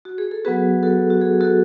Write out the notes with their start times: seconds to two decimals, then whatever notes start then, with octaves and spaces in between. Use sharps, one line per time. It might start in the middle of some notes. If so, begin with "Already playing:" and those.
0.05 F#4
0.18 G#4
0.31 A4
0.45 F#3 B3 F#4 G#4 B4
0.83 F#4 A4
1.10 F#4
1.21 G#4
1.41 F#4 A4